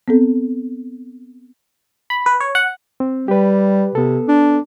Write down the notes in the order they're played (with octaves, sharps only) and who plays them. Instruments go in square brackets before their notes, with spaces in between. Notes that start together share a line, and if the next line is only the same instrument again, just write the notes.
[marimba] B3 C4 A4
[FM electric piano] B5
B4
C#5
F#5
[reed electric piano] C4
[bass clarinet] G3 [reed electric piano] G4 B4
[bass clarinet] C3 [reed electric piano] B3 A4
[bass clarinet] D4